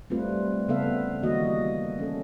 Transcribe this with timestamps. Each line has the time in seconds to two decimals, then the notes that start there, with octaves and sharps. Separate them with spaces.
0.10 G3 A3 C4 F4 B4
0.68 C#3 B3 A4 B4 E5 F5
1.23 D#3 E3 G3 A#3 F#4 D#5
1.99 C#4 A4